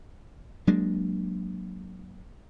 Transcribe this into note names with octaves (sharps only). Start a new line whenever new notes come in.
F#3 G#3 A#3 D4